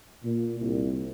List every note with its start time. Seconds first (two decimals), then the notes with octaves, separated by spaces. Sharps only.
0.23 A#2
0.60 C2